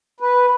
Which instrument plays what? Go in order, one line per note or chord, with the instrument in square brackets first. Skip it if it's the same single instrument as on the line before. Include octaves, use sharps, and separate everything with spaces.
[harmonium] B4